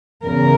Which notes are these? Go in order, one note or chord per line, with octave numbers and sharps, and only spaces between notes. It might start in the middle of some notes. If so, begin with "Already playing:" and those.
E2 C#3 A#4